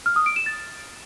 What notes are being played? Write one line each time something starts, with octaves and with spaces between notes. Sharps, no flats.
F6
D#6
D7
E7
A6